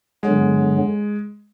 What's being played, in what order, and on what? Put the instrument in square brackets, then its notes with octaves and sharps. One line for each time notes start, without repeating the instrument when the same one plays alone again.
[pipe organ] G2 D3 F#3 B3 [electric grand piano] G#3